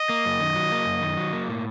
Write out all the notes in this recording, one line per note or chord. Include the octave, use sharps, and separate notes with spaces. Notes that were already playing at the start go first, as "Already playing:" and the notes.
Already playing: D#5
A#3
F#2
D#3
F#3
A#3
F#2
D#3
F#3
A#3
A2